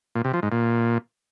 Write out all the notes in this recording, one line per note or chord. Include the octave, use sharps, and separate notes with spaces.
A#2
C3
F3
G#2
A#2